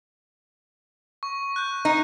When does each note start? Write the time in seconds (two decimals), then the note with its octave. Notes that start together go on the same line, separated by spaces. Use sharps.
1.23 C#6
1.56 F#6 G6
1.85 D#4